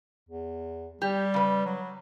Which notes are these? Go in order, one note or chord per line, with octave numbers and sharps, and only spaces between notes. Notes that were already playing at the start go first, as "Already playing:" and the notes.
E2
G3 G4
C#3 B4
F#3